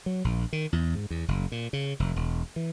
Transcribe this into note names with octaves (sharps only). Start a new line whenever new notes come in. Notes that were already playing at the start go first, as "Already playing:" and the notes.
F#3
A#1
D#3
E2
G#2
E2
F#1
A#2
C#3
F1
E1
E3